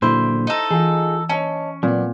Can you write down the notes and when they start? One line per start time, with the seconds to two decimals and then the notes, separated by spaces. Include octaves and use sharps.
0.02 A#2 D3 F#3 E4 C5
0.47 D#4 A4
0.71 E3 F4 G#4
1.29 C#4 C#5 D#5 A5
1.83 A#2 F#3 B3 C4